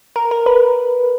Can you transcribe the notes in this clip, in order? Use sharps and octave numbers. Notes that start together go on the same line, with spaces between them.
A#4
A#4
B4